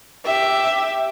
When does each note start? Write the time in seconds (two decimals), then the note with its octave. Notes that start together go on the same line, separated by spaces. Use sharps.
0.24 G4 E5